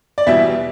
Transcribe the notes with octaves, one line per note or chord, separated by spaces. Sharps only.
D5
E2 B2 G3 B3 E4 E5